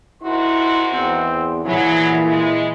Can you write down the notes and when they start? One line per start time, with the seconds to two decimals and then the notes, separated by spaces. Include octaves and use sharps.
0.22 G#2 D#3 E4 F#4 C6
0.93 E2 C4
1.65 A#2 E3 F#3 E4 G#4
2.26 G#3